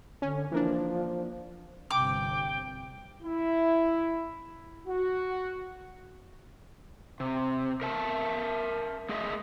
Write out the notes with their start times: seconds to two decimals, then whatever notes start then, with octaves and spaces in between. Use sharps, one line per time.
0.22 D3 C#4
0.52 E3 F3 A#3 D4
1.91 G1 C3 G5 D6
3.23 E4
4.87 F#4
7.20 C3
7.82 A#4 E5 A5
9.09 A3 G#4 D#5 E5